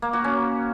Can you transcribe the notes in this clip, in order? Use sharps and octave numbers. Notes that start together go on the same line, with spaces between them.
A#3
F#4
C#4